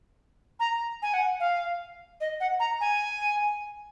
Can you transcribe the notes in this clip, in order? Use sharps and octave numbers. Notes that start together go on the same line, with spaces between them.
A#5
G#5
F#5
F5
D#5
F#5
A#5
G#5